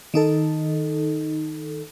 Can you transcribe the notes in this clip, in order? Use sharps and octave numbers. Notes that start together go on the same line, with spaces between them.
D#3 D#4 A4